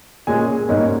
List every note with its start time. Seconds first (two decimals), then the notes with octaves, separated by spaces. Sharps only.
0.27 A#2 G#3 C#4 G#5
0.69 G#2 G3 A#3 C#4